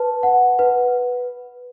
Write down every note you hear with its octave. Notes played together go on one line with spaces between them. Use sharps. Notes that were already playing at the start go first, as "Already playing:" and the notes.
Already playing: B4 A5
F#5
B4